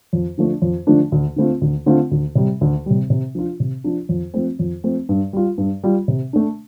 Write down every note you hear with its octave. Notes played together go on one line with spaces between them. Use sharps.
F2
D3 F3 A3 D4
F2
D3 F3 A3 D4
D2
D3 A3 C4 F4
D2
D3 A3 C4 F4
D2
C3 G3
D2
C3 G3
C3
F3 D4 F4
C3
F3 D4 F4
F2
F3 A3 C4
F2
F3 A3 C4
G2
G3 F4
G2
G3 F4
C3
A3 D4